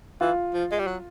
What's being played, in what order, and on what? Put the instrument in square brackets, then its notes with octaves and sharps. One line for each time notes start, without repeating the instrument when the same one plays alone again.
[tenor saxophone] E3 [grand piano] F4
[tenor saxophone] F3
G#3
G3
F#3